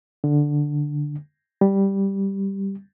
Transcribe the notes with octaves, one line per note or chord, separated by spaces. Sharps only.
D3
G3